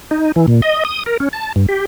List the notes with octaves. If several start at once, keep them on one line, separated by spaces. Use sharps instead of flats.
D#4
E3
A#2
D#5
D#6
A#4
C#4
A5
G2
G4